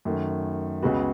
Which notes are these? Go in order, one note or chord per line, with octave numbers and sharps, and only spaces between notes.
F#2 D#3 A3
C#2 C#3 G#3 B3 F#4